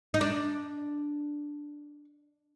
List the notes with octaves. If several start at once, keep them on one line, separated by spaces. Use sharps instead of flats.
D#4
D4